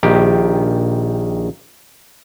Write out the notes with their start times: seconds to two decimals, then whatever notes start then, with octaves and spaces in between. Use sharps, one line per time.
0.03 A#1 D#3 G4